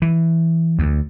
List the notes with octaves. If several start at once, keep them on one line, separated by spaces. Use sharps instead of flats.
E3
D2